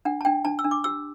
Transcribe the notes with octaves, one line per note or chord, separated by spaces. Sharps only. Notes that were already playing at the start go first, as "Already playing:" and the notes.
D4 F#5
A5
D4 G5
D4 A5
E6
D4
D6
G4 E6